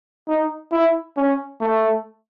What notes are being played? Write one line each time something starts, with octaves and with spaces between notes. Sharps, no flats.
D#4
E4
C#4
A3